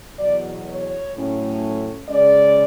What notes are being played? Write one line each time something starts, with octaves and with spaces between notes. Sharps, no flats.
E2 B2 F#3 D5
C#5
A2 F#3 A3 C#4
C#3 G#3 C#4 D5